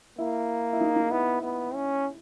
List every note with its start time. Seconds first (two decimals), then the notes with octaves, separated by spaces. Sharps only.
0.18 A#3 E4
0.73 E4
0.81 D#4
0.96 D#4
1.11 B3 E4
1.43 B3
1.74 C#4